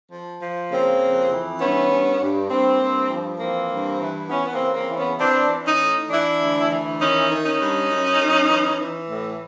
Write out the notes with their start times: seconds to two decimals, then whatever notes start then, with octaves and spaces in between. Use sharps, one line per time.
0.11 F3
0.41 F3
0.70 C#3 A#3 C4
1.01 F2
1.31 E3
1.60 G2 B3 C#4
1.90 G2
2.20 G2
2.50 G2 A#3 C4
2.80 G2
3.10 F3
3.40 E3 A#3 C4
3.70 G2
4.00 E3
4.30 E3 B3 C#4
4.46 B3
4.53 A#3 C4
4.60 C#3
4.74 A#3 C4
4.90 E3
4.97 B3 C#4
5.19 E3 C4 D4
5.50 E3
5.65 C#4 D#4
5.79 A2
6.10 E3 D4 E4
6.39 D2
6.70 E3
6.99 D#3 C#4 D#4
7.30 D#3
7.44 C#4 D#4
7.60 G2
7.89 F#2
8.20 F#2
8.49 E3
8.79 E3
9.09 A2